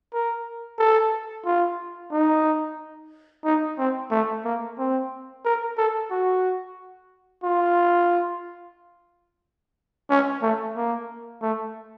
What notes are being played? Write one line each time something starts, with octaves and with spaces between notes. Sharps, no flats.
A#4
A4
F4
D#4
D#4
C4
A3
A#3
C4
A#4
A4
F#4
F4
C#4
A3
A#3
A3